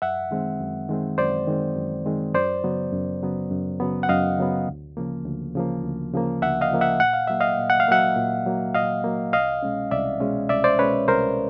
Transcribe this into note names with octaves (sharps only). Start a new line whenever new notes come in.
F#2 E5 F#5
D#3 G#3 C4
F#2
D#3 G#3 C4
F#2 C5 D5
D#3 G#3 C4
F#2
D#3 G#3 C4
F#2 C5 D5
C#3 F#3 B3
F#2
C#3 F#3 B3
F#2
C#3 F#3 B3
F#5
F#2 D#5 F5
C#3 F#3 B3
D2
C#3 F3 A#3
D2
C#3 F3 A#3
D2
C#3 F3 A#3
D2 E5 F#5
D#5 F5
C#3 F3 A#3
E5 F#5
A#2 F#5
F5
F#3 A#3 E5
D#5 F5
A#2
F#5
F5
F#3 A#3 E5 F#5
A#2
F#3 A#3
A#2 D#5 F5
F#3 A#3
C2 D#5 F5
B2 G#3 C#4
C2 D5 E5
B2 G#3 C#4
C2 D5 E5
C5 D5
B2 G#3 C#4 B4 C#5
C2 A#4 C5